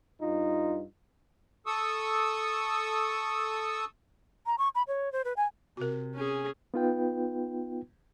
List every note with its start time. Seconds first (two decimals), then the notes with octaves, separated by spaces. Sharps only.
0.21 G2 D#4 F4
1.66 A4 C#6 D#6 E6
4.46 A#5
4.58 C#6
4.75 B5
4.87 C#5
5.12 C5
5.25 B4
5.37 G#5
5.77 C3 F#4 A#4
6.15 C#4 G#4
6.74 B3 D#4 F4 B4 G5